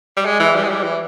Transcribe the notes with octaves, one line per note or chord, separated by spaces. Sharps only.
G3
G#3
E3
G3
G#3
G3
E3